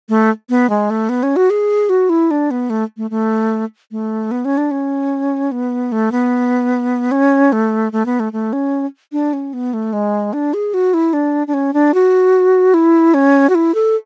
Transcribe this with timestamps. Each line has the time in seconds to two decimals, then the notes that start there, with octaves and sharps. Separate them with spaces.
0.09 A3
0.49 B3
0.70 G#3
0.90 A3
1.09 B3
1.23 C#4
1.36 F#4
1.50 G#4
1.89 F#4
2.09 E4
2.31 D4
2.51 B3
2.70 A3
2.97 A3
3.10 A3
3.91 A3
4.31 B3
4.45 C#4
4.57 D4
4.71 C#4
5.51 B3
5.92 A3
6.12 B3
7.11 C#4
7.52 A3
7.92 A3
8.06 B3
8.20 A3
8.33 A3
8.53 C#4
9.12 D4
9.33 C#4
9.53 B3
9.73 A3
9.93 G#3
10.33 D4
10.54 G#4
10.74 F#4
10.94 E4
11.13 D4
11.47 D4
11.54 C#4
11.73 D4
11.94 F#4
12.74 E4
13.14 C#4
13.49 F#4
13.55 E4
13.74 A4